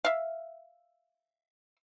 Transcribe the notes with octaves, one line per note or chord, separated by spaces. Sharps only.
E5 F5